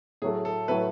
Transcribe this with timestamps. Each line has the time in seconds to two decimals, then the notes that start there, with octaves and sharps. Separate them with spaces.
0.22 A2 F#3 A3 G#4
0.45 A4
0.68 A2 F#3 A3 B4